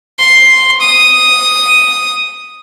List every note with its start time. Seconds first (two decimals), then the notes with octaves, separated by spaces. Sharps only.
0.19 C6
0.81 D#6